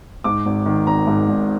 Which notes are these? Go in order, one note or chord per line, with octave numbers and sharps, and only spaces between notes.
G#2 D6
G#1
D#3
G#1 A#5
G#2
G#1